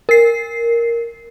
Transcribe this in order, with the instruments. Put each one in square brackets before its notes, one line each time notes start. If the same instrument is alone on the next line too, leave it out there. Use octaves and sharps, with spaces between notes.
[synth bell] A#4 C7